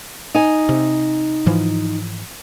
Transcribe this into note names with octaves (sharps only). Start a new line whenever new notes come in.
D#4 G#5
C3
G#2 E3 F3